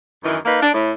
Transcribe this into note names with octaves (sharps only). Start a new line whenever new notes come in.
F#2 D#3 E3
A#3 D#4 B4 F5
D4
A2